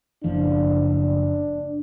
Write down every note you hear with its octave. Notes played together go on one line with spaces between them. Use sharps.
F#1 F3 D4